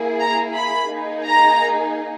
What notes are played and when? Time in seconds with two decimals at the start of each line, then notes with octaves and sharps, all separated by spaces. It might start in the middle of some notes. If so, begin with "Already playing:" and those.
Already playing: A#3 E4 G#4
0.20 A#5
0.56 B5
0.91 A#3 D#4 G#4
1.27 A#5